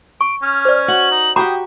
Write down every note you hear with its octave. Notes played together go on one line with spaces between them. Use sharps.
C#6 D7
C#4 F6
C5 D5
F#4 F#7
D#4
F#4 G4 F#5 G5 A#5 B5 D#6